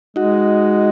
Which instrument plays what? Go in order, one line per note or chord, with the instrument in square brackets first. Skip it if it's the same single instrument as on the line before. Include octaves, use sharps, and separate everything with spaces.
[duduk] G#3 [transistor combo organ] D#4 F#4